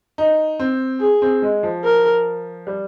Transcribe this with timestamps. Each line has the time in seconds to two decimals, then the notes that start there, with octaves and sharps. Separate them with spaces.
0.18 D#4
0.59 C4
1.01 G#4
1.22 C4
1.42 G#3
1.63 F3
1.84 A#4
2.67 G3